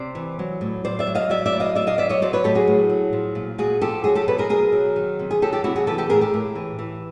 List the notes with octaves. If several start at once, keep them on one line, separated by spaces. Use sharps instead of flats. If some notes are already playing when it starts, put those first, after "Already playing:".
Already playing: C3 C5 D5
E3
F#3
A2
A2 C5 D5
D5 E5
F#3
D#5 F5
F#3 D5 E5
D5 E5
A2
D#5 F5
A2 D5 E5
D#5 F5
F#3 D5 E5
C#5 D#5
F#3 C5 D5
B4 C#5
A2 G4 A4
F#4 G#4
A2
F#3
F3
A#2
A#2 F#4 G#4
F3 G4 A4
F#3 F#4 G#4
G4 A4
B2 A4 B4
G#4 A#4
B2 G#4 A#4
F#3
D#3
C3
G#4
F#3 G4 A4
G4 A4
C3 E4 F#4
F#4 G#4
E3 G4 A4
G4 A4
A2 G#4 A#4
G4 A4
A2
E3
E3